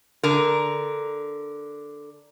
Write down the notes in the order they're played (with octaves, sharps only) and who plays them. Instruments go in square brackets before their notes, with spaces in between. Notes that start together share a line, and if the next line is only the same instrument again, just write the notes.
[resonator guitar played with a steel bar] D3 A#4